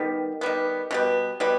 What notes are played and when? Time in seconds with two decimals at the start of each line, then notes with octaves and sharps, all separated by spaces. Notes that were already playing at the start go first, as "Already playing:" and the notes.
Already playing: D#3 G3 B3
0.41 D#3 G3 B3
0.91 B2 G3 B3
1.40 B2 G3 B3